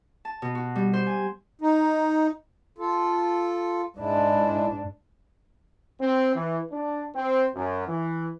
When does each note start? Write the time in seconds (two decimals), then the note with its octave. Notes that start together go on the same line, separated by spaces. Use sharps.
0.25 A5
0.42 B2
0.55 F#4
0.75 G3
0.94 C5
1.06 G#5
1.61 D#4
2.78 F4 A4
3.98 G#2 G#3 D4 E4
6.00 C4
6.35 E3
6.71 D4
7.14 C4
7.54 F#2
7.87 E3